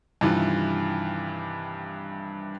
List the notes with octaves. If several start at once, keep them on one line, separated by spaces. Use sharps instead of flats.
G2 C3 D#3 E3 F4